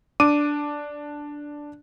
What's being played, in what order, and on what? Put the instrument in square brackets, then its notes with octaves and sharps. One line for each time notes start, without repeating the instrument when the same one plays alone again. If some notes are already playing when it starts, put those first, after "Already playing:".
[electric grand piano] D4 D6 D#7